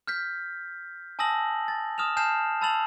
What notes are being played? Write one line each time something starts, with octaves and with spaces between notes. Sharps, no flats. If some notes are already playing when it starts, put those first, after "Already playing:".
F6 G6 B6
G#5 A5 D#6 E6 A#6 F#7
A6
D#6 F6 E7 F7
G#5 A5 F6 G6 C7 E7
A5 B5 E6 A6 F7 F#7